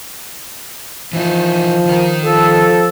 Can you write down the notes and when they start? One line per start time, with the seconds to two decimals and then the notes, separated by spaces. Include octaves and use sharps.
1.13 E3 F3 D#4
1.86 D#3 A#4
2.23 F3 A4